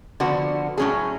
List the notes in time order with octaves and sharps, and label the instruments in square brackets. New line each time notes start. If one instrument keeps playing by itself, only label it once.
[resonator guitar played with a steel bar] D3 F3 B3 F#4
A2 F#3 C#4 G#4